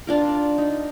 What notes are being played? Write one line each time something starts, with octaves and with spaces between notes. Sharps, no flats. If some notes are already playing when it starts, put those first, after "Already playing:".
D4 F4 A#4
D#4